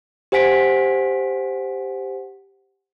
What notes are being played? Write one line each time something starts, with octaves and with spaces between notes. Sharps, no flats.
G4 C5 F#5 G#5 B6 D7